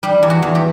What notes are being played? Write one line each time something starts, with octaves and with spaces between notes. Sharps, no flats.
G3 G4
E2
F#4
E2
G4